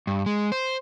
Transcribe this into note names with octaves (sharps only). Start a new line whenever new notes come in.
G2
G#3
C5